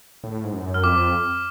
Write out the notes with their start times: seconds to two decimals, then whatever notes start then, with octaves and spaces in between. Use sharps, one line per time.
0.24 A2
0.44 G#2
0.53 F#2
0.74 F6
0.83 F2 D6